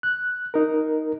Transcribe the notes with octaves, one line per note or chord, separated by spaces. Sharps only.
F#6
D#4 A#4